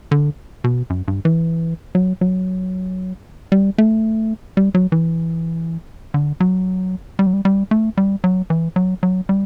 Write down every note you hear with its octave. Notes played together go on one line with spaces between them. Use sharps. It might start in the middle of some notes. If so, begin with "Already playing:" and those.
D3
B2
F#2
G2
E3
F#3
F#3
G3
A3
G3
F#3
E3
D3
F#3
G3
F#3
G3
G3
A3
G3
F#3
E3
F#3
F#3
G3